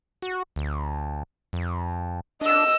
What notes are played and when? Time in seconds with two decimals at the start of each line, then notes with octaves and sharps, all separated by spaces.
0.22 F#4
0.56 D2
1.53 F2
2.41 D4 D#5 E6